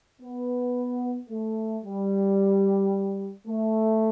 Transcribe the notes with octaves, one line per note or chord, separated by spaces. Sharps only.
B3
A3
G3
A3